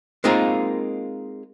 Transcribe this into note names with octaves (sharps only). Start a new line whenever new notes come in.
G#3 A#3 C4 D#4 F4 A#4